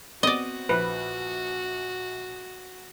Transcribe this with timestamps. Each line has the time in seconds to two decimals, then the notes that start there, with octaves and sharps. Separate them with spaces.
0.23 B3 C4 F#4 D5 D#5 D#7
0.69 A#1 B4 C5